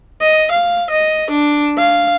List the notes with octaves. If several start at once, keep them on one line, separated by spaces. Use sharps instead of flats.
D#5
F5
D#5
D4
F5